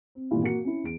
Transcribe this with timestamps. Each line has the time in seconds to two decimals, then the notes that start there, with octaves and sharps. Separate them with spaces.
0.15 C4
0.31 G2 A#2 D#3 E3 E4 F4
0.42 A#3 F#4 C#7
0.64 C#4 E4
0.83 E2 D7